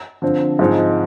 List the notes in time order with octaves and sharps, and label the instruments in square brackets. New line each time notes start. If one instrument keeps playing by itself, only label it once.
[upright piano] D3 F3 C4
G#2 F3 G#3 C4 D#4